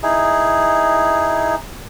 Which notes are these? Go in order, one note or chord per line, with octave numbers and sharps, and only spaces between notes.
D#4 E4 G#4